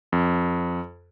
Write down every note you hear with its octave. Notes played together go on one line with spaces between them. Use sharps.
F2